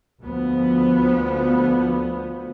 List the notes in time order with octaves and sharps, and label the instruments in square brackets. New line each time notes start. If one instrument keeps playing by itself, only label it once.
[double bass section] D2 F3 B3